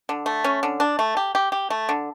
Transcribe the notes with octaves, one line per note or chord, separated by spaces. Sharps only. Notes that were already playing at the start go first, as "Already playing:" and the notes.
D3
A3
C#4
D3
D4
A3
G4
G4
G4
A3
D3